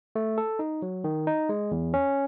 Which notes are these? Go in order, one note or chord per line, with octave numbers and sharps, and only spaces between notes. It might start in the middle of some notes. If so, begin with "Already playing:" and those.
A3
A4
D#4
F#3
D#3
D#4
G#3
E2
C#4